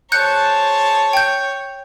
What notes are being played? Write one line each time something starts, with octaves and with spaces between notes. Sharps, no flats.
G#4 C5 C#5 A5 F#6 G6 C#7
G5 G6